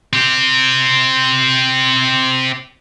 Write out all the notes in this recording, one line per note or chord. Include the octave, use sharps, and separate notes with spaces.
C4 G4